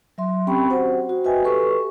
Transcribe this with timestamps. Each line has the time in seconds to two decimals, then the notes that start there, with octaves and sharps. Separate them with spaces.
0.18 F#3 E5 C6
0.47 C4 C#4 G4 G5 B5 C#6
0.70 F#4 C5 F#5
1.09 F#4
1.24 F#4 B4 D#5 E5 G5 G#5
1.44 G4 A4 B4 C#6